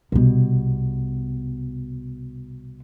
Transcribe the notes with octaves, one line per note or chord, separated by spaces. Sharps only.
C2 B2